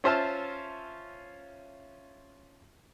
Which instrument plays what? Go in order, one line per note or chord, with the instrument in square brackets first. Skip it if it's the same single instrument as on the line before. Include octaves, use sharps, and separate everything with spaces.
[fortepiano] C#4 F4 C5 E5 F5 A5